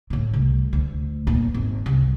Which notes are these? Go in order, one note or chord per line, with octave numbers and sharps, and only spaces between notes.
A2 D3
C2
D2
E2 A#2
G#1
C2